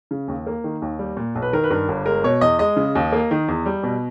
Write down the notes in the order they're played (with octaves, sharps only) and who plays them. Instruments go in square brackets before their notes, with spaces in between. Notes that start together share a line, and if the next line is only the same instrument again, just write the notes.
[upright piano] C#3
D#2
A#3
D#3
D#2
G3
A#2
B1
B4
D#3 A#4
B4
G2 A#4
G1
G#3 A#4
B2 C#5
E2 D#5
G#3 D#5
C#3
D#2
A#3
D#3
E2
G3
B2